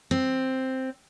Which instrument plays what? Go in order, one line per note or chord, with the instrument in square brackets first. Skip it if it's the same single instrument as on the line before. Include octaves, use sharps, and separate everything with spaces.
[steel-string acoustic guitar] C4